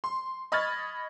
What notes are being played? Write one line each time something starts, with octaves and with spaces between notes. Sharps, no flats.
C6
D#5 B5 C#6 F6 G#6 A6